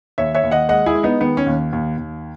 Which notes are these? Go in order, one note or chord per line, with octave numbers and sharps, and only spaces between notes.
D#2 C#5 E5
C#5 E5
D#2
D#5 F#5
G#3 D#5 F#5
E4 G#4
G#3
B3 D#4
D#3 B3
C#4
D#2
D#2
D#2